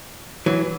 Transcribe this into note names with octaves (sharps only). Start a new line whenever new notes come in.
E3 F#3